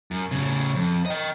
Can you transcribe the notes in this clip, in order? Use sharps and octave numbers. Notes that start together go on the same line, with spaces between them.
F#2
A2 C#3
F2
D#5 G5